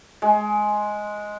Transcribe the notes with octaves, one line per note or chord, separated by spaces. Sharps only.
G#3